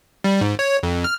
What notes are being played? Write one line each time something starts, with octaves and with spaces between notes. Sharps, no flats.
G3
G#2
C#5
F2
F6